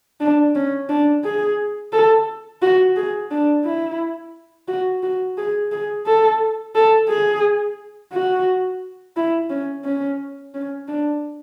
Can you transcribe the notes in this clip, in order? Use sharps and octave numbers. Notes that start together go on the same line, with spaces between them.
D4
C#4
D4
G#4
A4
F#4
G#4
D4
E4
F#4
F#4
G#4
G#4
A4
A4
G#4
F#4
E4
C#4
C#4
C#4
D4